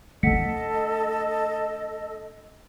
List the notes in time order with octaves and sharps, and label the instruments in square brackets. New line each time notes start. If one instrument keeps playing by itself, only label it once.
[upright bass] A3 D4 [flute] A4 [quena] D#5 [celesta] F#5 B6 C#7